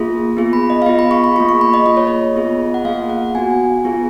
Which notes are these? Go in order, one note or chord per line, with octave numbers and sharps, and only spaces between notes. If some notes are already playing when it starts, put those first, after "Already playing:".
Already playing: A#3 F4 G#4
B3 F4 G#4
B5
D#5
F5
B3 F4 G#4 D#5
B5
C#6
B5
A#3 F4 G#4 C#6
C#6
B5
D#5
A#3 F4 G#4 D#5
C#5
D#5
B3 F4 G#4
F#5
A#3 F4 G#4 F5
F#5
B3 F#4 G#5
B3 F4 G#4